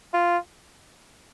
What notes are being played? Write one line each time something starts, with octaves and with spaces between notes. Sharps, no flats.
F4